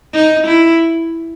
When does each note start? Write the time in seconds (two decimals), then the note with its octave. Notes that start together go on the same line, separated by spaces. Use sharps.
0.13 D#4
0.47 E4